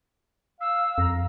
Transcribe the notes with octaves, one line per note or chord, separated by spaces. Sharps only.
F5 E6
F2 A#5